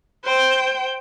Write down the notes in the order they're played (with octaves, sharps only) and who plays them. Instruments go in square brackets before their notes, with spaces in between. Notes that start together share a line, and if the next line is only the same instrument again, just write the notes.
[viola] C5 G5